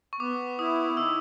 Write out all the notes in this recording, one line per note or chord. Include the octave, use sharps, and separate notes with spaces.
C#6
B3 D6
E4 D#6
D#3 E6